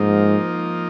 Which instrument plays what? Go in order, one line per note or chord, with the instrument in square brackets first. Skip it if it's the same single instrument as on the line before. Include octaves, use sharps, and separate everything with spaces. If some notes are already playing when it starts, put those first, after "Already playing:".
Already playing: [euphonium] G#2 [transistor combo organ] F3 A#3 D#4